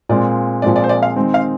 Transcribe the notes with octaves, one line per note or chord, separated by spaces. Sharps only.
A#2 G#3 C4 F4 D5
A#2 F3 G#3 C4 D5
D5
C5
D5
F5
D#3 G#3 C4 D#4
F5